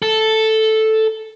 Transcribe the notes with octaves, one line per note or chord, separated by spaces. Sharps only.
A4